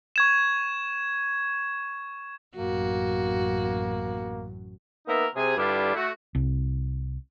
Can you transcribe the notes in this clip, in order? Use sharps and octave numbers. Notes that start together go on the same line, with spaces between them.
C#6 G#6 E7
A1 F#2 A#3 F#4
A#3 B3 D#4 A#4 E5
C3 G#4
G2 D3 G3 D4 E4 F4
A3 F#4
C2